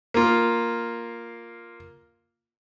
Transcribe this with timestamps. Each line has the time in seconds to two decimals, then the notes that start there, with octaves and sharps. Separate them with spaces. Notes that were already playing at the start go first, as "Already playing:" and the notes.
0.14 A#3 F4